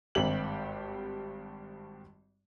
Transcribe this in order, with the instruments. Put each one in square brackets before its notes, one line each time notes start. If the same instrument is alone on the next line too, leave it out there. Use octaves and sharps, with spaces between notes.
[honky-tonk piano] G#1 G2 C4 G4 F#7